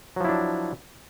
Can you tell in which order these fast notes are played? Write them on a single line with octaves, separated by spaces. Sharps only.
F#3 F3 E4 D4